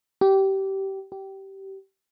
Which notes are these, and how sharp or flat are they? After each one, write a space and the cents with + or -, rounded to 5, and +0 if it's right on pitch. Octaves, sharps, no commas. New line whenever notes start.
G4 -20
G4 -20